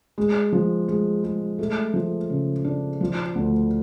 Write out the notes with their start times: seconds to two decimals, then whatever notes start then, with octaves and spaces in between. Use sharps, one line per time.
0.18 G#3
0.53 F3
0.88 G#3
1.24 G#3
1.59 A3
1.94 F3
2.30 C#3
2.64 D4
3.01 F3
3.35 D2